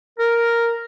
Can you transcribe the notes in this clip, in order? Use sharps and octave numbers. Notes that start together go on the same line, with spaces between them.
A#4